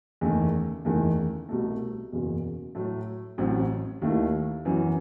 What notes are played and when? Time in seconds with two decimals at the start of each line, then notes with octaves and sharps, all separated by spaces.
0.21 F#1 E2 D#3 A3
0.85 F#1 E2 D#3 A3 E4
1.49 C2 B2 A3
2.12 F#1 E2 B2
2.75 A2 F#3 A3
3.38 A1 A2 F#3 C4 F#4
4.02 D#2 D#3 A3 E4
4.65 F#2 E3 B3 F#4